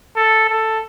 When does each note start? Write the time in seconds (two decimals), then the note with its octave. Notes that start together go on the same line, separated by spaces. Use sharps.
0.17 A4
0.50 A4